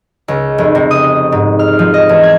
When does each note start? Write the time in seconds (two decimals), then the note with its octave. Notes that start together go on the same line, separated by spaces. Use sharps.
0.28 C#2
0.58 F1
0.75 C3
0.91 D#6
1.32 G#2
1.59 F6
1.79 F3
1.94 D#5
2.09 E2
2.23 G#6